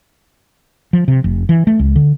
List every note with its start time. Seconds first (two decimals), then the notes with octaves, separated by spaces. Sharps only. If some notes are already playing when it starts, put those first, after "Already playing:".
0.93 F3
1.08 C3
1.24 F1
1.49 E3
1.67 A3
1.79 C#2
1.96 D3